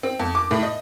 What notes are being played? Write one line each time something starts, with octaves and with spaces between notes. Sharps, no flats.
C4
F2
D6
A2
D#5